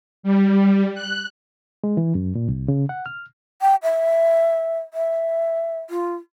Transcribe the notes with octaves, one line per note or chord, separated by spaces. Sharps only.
G3
F#6
G#3
E3
F#2
A#2
C2
C#3
F#5
F6
G5
E5
E5
F4